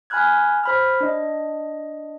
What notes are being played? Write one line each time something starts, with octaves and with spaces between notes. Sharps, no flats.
G#5 B5 F6 F#6 G#6
C5 B5 F6
D4 D#5